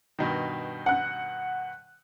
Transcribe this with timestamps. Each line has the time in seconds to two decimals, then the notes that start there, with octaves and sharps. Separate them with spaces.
0.19 G2 B2 D#3
0.86 F#5 F#6